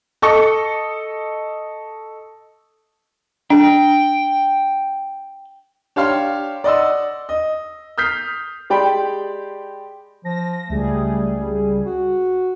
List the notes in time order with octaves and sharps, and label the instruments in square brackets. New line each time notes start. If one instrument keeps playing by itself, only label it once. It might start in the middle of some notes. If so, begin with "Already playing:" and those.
[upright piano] A4 D#5 C#6
[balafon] D4 [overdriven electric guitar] G5
[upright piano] D4 G4 C#5 F5 C6
D5 D#5 F#5 C6 E6
D#5
D#6 F6 G6 B6 C7
[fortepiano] G#3 G4 D5 G5 B5 C6
[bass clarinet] F3 [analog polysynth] A#6
[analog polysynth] C#2 G3 G#4 [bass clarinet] A3
[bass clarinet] F#4